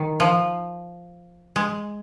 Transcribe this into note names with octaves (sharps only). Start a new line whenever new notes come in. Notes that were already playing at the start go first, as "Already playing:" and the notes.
Already playing: D#3
F3
G#3